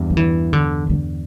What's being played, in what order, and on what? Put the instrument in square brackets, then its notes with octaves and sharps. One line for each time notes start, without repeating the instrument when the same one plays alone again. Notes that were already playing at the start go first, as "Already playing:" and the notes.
Already playing: [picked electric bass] E2 G2
[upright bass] F3
E3
D3
D3